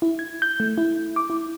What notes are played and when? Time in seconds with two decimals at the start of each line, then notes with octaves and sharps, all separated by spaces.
0.02 E4
0.19 G#6
0.42 G6
0.60 A3
0.78 E4
1.16 D6
1.30 E4